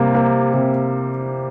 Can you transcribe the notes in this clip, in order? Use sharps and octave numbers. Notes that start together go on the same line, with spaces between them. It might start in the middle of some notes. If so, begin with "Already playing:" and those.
Already playing: C3 G3 A#3
A#3
C3